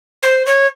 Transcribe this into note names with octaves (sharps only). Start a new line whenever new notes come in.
C5
C#5